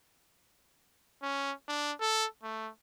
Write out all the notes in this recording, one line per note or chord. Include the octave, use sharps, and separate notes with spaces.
C#4
D4
A4
A3